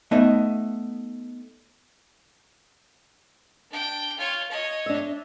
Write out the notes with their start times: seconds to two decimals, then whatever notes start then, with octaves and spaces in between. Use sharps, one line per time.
0.11 A3 B3 D#4 D#5 E5
3.70 D4 G5
4.17 F4 C#5
4.51 C#5 D#5
4.86 D4 E5